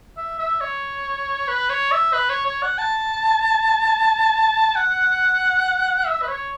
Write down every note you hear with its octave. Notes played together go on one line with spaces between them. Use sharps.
E5
E5
C#5
B4
C#5
E5
B4
C#5
C#5
F#5
A5
F#5
E5
B4
C#5